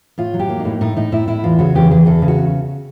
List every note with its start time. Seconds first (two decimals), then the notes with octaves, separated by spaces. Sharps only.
0.18 A2 F4
0.34 F#3
0.39 G4
0.49 A#3
0.60 D#4
0.65 A2
0.81 A2 D#4
0.96 A2 D#4
1.12 A2 E4
1.28 A2 E4
1.44 E2 F4
1.59 C#3 F#4
1.75 E2 G4
1.90 E2 G#4
2.06 E2 A4
2.22 C#3
2.28 F#4